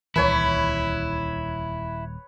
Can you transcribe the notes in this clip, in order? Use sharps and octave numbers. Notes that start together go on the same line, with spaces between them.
D#1 C#2 E3 E4 B4 C#5 A#5